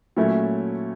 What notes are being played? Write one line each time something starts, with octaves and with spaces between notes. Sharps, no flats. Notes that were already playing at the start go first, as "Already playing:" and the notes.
A#2 F#3 A3 C#4 E4